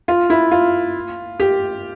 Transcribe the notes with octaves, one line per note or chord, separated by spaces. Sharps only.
F4
E4
F4
G4